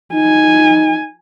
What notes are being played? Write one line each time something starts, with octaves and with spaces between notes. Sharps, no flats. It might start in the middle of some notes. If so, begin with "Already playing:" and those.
D#4 G#5